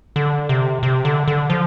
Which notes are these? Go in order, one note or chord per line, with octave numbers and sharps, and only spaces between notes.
D3
C3
C3
D3
D3
F3